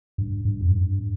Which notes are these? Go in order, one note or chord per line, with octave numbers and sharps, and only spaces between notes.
G2
G2
F2
G2